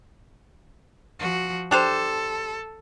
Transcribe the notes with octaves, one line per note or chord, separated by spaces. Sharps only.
F3 F#4
D4 G4 A4 C5